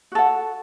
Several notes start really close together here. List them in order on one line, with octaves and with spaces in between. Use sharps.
F#4 A4 F#5